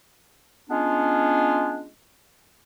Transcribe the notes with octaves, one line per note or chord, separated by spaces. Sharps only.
G#3 B3 C#4 D4 F4